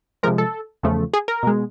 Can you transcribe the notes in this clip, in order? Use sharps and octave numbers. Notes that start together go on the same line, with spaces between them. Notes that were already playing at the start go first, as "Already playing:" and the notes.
C3 F3 G#3 A#4
A4
E2 C#3 F3 A3
G#4
A#4
B2 G#3